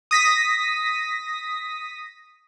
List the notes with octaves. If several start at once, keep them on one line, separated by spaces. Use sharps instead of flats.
D#6 A#6 B6